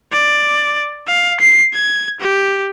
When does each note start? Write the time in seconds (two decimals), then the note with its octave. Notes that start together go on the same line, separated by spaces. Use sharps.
0.12 D5
1.07 F5
1.40 C7
1.74 G#6
2.20 G4